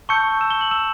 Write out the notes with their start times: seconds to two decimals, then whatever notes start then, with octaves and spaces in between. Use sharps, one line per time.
0.09 A5 C#6 E6 G6 C#7
0.41 E6 E7
0.51 G7
0.61 F#7
0.71 E6 E7